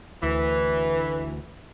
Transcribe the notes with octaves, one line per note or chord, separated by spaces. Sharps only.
D2 E3